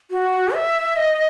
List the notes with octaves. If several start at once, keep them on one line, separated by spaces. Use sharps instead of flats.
F#4
E5
D#5